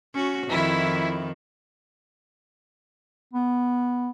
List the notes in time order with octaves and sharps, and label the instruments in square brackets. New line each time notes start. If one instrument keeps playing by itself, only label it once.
[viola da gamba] C#4 F#4
[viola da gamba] F2 D#3 [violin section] E4
[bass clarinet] B3